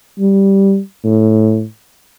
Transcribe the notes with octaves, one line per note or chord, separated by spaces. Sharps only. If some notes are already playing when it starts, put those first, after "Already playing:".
G3
A2